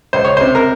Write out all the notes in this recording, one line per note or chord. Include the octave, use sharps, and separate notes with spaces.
C#2 C5
C#5
C5
C3
A#4